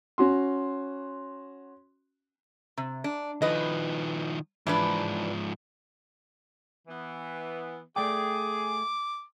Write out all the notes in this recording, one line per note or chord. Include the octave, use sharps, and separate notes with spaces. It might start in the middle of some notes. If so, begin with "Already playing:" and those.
C#4 F#4 C6
C3
D4
D#3 F3 B4 D#5
G#2 E3 F3 D4 B4
E3 B3
A3 G#4 D5 G5 D6